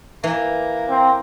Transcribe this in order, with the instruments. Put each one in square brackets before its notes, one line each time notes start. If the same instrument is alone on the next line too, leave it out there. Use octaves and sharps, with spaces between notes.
[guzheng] E3 [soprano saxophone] A#3
[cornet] C4